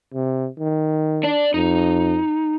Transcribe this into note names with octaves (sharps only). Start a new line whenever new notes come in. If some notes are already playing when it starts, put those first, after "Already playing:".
C3
D#3
D4 D5
F2 D#4